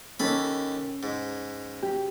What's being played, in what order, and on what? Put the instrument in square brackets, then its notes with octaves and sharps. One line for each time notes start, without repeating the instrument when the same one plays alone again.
[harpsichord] D#2 A4 B5 [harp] C#4
[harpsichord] G#2
[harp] G4